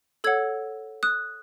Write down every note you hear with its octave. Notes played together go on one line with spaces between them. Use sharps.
A4 C#5 F#5 E6 G#6
D#6 F#6